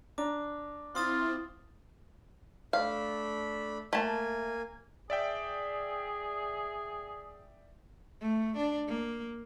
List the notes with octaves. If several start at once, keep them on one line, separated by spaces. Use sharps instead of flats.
D4 A#5 D6
C4 E4 F4 C6 D#6 A6
A3 D4 F5 B5
A3 A#3 G#5 A5
G#4 D5 E5 G5
A3
D4
A#3